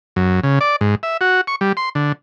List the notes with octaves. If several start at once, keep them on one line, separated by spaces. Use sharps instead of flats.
F#2
C#3
D5
G#2
E5
F#4
C#6
G3
C6
D3